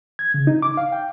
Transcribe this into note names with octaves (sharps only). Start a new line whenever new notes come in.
G#6
C#3
D#4
D6
F5
G5